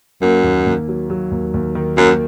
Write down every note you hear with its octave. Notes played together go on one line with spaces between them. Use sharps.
F#2 A#3
D#2
D#2
F#3
F#3
D#2
D#2
D#3
F#2 A#3